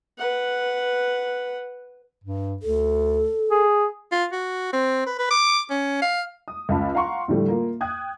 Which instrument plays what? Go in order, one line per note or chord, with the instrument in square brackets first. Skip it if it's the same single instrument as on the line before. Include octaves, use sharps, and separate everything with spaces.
[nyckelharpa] B4 F#5
[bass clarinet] G2
[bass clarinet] D2 [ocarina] A4
[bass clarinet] G#4
[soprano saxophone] F4
F#4
C4
B4
B4
D6
C#4
F5
[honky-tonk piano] D#6
C#2 C#3 A5 B5
F5 F#5 A#5 C6 C#6
A2 D3 F3 G3 A3
A#3 F4
G5 D#6 F#6 G#6